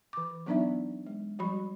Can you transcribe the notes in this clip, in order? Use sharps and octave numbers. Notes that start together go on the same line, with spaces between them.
E3 D6
F#3 B3 D4 D#4 D5 E5
G#3
F3 G3 F#4 B5